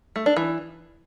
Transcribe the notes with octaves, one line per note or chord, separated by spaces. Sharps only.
A3
D4
E3